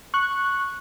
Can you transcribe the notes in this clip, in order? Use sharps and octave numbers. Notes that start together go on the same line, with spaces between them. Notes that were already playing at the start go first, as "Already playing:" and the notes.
C#6 F#6